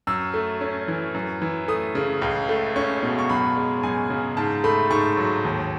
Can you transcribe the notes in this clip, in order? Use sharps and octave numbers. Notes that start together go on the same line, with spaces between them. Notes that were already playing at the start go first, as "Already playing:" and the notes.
F#2 E6
A3
C#4
E3
F#2
E3
A3 D#6
C#3
C#2
A3
C#4 C#6
B2
C#6
F#2 B5
G#3
F#2 G#5
C#3
G#2 A5
A3 B5
G#2 C#6
F#3
D#2